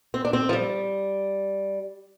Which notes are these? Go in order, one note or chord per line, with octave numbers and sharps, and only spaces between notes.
C4
D4
C4
F3
G3